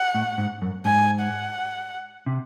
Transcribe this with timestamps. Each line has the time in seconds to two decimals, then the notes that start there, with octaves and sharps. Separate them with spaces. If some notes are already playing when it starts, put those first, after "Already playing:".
Already playing: F#5
0.15 A2
0.38 G#2
0.62 F#2
0.85 G#2 G#5
1.21 F#5
2.26 C3